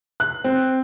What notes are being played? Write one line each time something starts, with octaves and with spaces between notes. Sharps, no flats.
F#6
C4